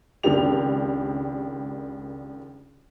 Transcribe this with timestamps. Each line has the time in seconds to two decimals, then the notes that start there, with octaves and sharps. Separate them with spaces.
0.23 G#1 C#2 D#3 D4 G4 F7